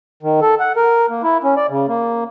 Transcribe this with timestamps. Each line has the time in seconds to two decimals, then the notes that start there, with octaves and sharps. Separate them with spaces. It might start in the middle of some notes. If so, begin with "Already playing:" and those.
0.23 D#3
0.42 A4
0.60 F#5
0.76 A#4
1.10 A#3
1.23 E4
1.44 C#4
1.57 D5
1.70 C#3
1.88 A#3